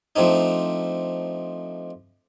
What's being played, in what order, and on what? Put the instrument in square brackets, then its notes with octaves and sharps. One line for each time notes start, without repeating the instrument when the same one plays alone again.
[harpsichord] F3 A3 C4 D4 D#4